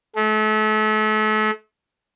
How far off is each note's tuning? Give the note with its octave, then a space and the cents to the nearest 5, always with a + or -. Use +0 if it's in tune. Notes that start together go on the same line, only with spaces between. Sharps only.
A3 -35